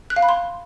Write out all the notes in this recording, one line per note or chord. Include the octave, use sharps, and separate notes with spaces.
F#6
F5
B5
C6